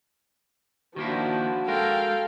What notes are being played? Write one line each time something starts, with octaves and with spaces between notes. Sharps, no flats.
D#3 F3 A#3 D4 E4 F#4
G#3 A4 A#4 F5 G5